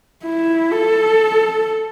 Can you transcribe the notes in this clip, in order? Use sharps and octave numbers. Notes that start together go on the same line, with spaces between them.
E4
A4